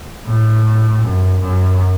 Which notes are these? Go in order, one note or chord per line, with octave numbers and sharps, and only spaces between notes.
A2
F#2
F#2